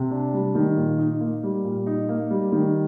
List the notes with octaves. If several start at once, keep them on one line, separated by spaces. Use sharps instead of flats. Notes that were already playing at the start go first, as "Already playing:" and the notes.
Already playing: C3
D4
G3
D#3
A#2
D#4
A#3
G3
A#2
D#4
A#3
G3
D#3